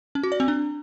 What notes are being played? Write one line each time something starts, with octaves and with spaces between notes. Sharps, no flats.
C#4
F#4
D5
C4
D4